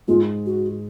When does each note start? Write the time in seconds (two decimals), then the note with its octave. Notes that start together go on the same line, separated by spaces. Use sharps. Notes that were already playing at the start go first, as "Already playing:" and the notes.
0.08 G#2 G#3 F4
0.46 F#4